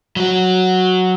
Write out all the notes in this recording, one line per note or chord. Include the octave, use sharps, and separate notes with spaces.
F#3 F#4